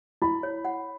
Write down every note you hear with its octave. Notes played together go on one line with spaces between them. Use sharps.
E4 B5
C#5
F#5